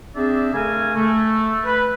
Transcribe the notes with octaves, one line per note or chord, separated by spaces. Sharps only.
C4 D4 G#4 D5 E5
C#3 A3 A4 A#4 G#5
A3
B4